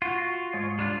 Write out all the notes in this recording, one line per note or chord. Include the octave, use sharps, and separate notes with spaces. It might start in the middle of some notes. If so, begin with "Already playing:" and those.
F4 F#4
G#2 G#3 C#5
G3 D4 F4